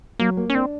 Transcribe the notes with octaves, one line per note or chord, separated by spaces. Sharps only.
F#3 A#3
A#3
C#4
C4 D4